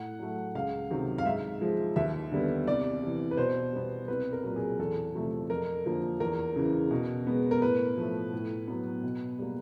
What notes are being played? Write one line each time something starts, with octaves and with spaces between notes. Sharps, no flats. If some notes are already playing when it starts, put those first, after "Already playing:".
Already playing: A2 F#5
F#3 A3
C#2 F5
C3 D#3 F#3
F5
G#2 E5
F3 G#3
D#2 E5
D3 G3 B3
C2 D5
C3 E3
B4
B2 C5
G3 B3
C2 B4
A#4
A#2 F#3
G#4
E2 A4
C3 F3 A3
F2 A#4
D3 F3 A#3
E2 A#4
C#3 E3
B2
G#3 B3
A#4
A2 B4
F3 A3
A2
F#3 B3
B2
G3 A#3